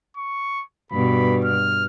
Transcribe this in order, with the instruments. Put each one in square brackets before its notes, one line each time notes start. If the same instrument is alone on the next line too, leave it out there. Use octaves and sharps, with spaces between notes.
[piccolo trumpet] C#6
[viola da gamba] G2 B2 [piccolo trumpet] B5
[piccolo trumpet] F6